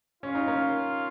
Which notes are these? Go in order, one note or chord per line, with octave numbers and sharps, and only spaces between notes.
C#4 F4
D#4
A#3 C#4